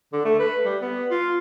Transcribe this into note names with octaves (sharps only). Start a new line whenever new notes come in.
D3
A3
B4
G3
B3
F4